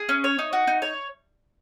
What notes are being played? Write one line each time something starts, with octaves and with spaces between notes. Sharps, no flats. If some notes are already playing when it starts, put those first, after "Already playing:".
Already playing: G#4
C#4
C#5
D#4
F#4
D#4
C#5